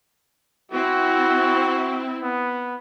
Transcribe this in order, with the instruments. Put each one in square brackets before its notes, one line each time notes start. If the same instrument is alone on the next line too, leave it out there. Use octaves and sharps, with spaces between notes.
[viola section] C4 E4 [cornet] F#4
[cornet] B3